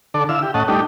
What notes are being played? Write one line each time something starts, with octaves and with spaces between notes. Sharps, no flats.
D3 A4 D5
D3 E4 F5 E6
G4
A2 C#4 D#5 F#5 A5
G3 A3 D4 D#4 G4